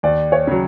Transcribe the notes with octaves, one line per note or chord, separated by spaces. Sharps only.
D#2 D5
C#5
C#3 F#3